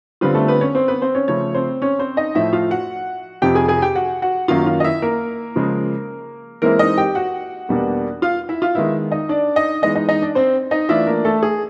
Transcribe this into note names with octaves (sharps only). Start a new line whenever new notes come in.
D3 G3 B3 C4 F4 B4
A3 A4
B3 B4
C#4 C#5
C4 C5
B3 B4
C4 C5
C#4 C#5
C#3 F3 A3 C#4 C#5
C4 C5
C#4 C#5
C4 C5
D#4 D#5
A2 F3 A3 E4 E5
F4 F5
F#4 F#5
F2 C3 F3 G4 G5
G#4 G#5
G#4 G#5
G4 G5
F#4 F#5
F#4 F#5
F#2 D#3 F#3 A#3 C#4 F4 F5
F4 F5
D#5
E4 E5
A#3 A#4
C#3 F3 G#3
E3 G#3 A#3 C4 E4 A#4
D#4 D#5
G4 G5
F#4 F#5
E2 B2 G3 A#3 D4
F4 F5
E4 E5
F4 F5
D#3 G#3 B3 E4 E5
D#4 D#5
D4 D5
D#4 D#5
E3 G#3 B3 D#4 D#5
D#4 D#5
D#4 D#5
D4 D5
C4 C5
D#4 D#5
E3 A3 D4 E4 F4 E5
A#3 A#4
A3 A4
G#4